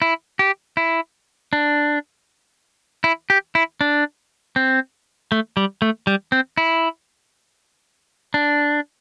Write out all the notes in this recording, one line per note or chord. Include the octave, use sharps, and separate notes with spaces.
E4
G4
E4
D4
E4
G4
E4
D4
C4
A3
G3
A3
G3
C4
E4
D4